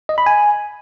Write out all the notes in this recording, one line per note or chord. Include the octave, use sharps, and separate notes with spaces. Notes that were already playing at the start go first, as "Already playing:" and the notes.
D#5
B5
G#5